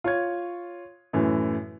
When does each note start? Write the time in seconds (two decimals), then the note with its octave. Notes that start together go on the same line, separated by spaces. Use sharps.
0.04 F4 C#5 G#6
1.13 F#2 A2 E3